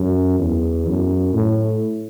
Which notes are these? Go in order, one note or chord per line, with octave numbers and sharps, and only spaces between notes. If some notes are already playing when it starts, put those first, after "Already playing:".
Already playing: F#2
E2
F#2
A2